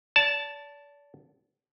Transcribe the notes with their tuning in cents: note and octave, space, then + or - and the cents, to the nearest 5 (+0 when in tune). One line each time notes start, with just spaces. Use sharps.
D5 -40 A5 +0